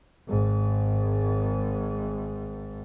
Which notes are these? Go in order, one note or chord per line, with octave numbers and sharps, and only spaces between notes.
G#1 G#2